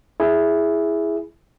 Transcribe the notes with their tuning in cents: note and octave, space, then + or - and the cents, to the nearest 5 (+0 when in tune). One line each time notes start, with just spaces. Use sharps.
E4 +0 G#4 +0